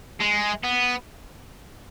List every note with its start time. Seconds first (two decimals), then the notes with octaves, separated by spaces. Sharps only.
0.20 G#3
0.64 B3